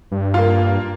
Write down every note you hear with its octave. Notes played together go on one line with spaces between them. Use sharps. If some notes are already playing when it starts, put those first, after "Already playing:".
G2
A#3 F4